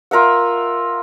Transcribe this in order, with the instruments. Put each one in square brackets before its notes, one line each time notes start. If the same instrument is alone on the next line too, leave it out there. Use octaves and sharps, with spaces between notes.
[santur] F4 A#4 E5 F#5